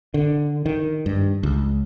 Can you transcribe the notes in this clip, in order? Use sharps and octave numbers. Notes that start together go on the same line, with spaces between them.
D3
D#3
G2
C#2